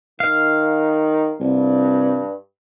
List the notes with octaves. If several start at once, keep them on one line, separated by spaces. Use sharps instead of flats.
D#3 F5
C2 G2